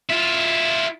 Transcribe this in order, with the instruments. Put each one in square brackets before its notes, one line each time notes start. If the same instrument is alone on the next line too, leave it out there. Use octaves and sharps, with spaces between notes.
[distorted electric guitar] E4 F4